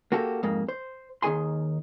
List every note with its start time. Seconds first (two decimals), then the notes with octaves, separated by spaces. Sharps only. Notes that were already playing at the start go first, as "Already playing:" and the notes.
0.12 A#3 F#4 G4 A4
0.43 F2 G#2 A#3
0.68 C5
1.22 D#2 D#3 F4 G#4 G#5 C6